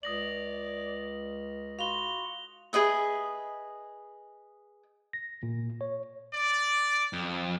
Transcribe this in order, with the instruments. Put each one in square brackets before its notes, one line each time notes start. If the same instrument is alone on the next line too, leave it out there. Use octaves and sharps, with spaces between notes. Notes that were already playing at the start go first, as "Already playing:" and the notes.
[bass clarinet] C#2 [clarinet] D5 [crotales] D#6 A#6 F#7
[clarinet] F#4 [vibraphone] F5 B5 C6 [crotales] F7 G7
[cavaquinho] G#4 B4 D#5 E5
[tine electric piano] A#6
A#2
C#5
[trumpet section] D5
[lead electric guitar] F2